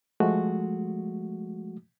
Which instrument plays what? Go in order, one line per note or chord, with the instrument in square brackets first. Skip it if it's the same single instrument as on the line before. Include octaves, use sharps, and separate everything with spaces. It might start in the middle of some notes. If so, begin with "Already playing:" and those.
[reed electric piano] F3 G#3 A3 F#4